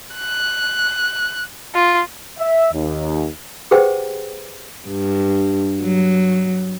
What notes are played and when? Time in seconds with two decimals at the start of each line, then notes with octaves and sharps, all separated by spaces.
0.15 F#6
1.75 F4
2.39 E5
2.72 D#2
3.71 G4 G#4 B4 C5 F#5 G5
4.88 G2
5.82 F#3